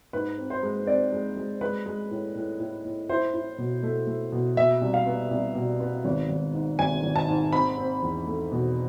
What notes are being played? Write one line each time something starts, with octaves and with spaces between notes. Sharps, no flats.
G#2 B4
C4
C5
G#3
C4 D5
G#3
G#3
G#3 B4
G#3
A2
A2
A2
A2
E4 C5
E4
B2
A3
A3
B2
B2 E5
C2
F5
B3
C2
B2
B3
G#1
G#1
G#2
G#1 G#5
G#1
A5
G#2
C4 B5
C4
E2
A3
B2